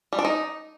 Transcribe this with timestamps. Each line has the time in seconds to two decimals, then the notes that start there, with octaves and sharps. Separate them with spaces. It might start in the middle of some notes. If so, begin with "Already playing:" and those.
0.13 G3
0.19 D4
0.25 D#4